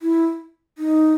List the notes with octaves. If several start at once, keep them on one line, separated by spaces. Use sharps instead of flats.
E4
D#4